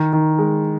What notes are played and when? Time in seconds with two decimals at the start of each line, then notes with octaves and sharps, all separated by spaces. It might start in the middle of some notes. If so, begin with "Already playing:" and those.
Already playing: D#3
0.13 D#3
0.39 G#3